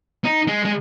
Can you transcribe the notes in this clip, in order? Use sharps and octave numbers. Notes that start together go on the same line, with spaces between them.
D#4
G#3
G#3